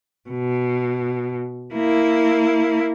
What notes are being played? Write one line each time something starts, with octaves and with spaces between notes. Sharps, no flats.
B2
A#3 E4